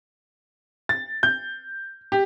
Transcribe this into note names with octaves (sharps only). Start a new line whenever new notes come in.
A6
G6
G4